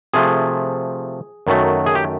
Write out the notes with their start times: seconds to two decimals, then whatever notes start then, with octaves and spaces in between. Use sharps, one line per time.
0.14 C3 F3 A3 G#4
1.47 F#2 D#3 F#3 A3
1.86 G#4
1.95 G4